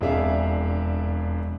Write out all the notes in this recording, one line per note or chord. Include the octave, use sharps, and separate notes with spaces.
E1 F2 D4 G#4 E5 F5